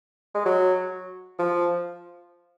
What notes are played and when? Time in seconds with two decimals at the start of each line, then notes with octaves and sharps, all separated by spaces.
0.35 G#3
0.46 F#3
1.39 F3